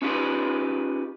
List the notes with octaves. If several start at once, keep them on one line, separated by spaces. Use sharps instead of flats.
C#4 D#4 F4 G4 G#4 B4